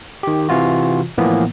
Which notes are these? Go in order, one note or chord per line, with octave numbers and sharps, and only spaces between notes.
D#3 G4
C3 E3 F4 F#4
A2 E3 F3 A#3 B3